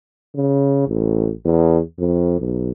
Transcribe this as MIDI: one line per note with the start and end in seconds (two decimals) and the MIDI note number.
0.35 0.85 49
0.87 1.31 33
1.45 1.79 40
1.99 2.39 41
2.40 2.71 35